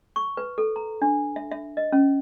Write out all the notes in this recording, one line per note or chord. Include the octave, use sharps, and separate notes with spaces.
C#6
B4
A4
A#5
D4
E5
E5
D#5
C#4